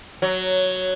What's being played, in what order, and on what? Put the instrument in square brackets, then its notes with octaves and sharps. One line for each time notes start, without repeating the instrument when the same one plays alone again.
[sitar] F#3